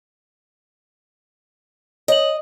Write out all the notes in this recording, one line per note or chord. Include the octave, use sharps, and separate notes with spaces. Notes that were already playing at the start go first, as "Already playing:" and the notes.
C#5 D#5 F#7